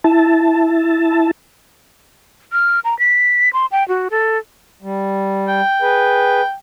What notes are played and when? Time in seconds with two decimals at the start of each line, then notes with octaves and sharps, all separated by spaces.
0.04 E4 A5
2.52 F6
2.84 A#5
2.99 B6
3.53 C6
3.72 G5
3.88 F#4
4.10 A4
4.82 G3
5.48 G5
5.82 G#4 B4